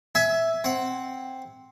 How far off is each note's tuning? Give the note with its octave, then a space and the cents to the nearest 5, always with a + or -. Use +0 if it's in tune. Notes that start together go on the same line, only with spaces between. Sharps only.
E5 +0 G#5 +20
C4 +0 F#5 +20